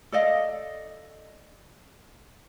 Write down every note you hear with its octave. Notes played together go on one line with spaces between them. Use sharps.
A4 D5 D#5 F5